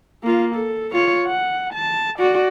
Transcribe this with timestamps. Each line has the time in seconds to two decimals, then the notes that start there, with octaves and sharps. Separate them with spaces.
0.23 A#3 F4
0.56 A4
0.93 F4 C#5
1.26 F#5
1.74 A5
2.19 F#4 D5